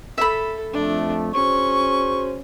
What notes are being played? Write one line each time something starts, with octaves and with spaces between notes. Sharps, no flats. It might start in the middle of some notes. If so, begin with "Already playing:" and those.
A4 E5 B5
F2 A3 D4
C#4 F#4 G#4 C5 C#6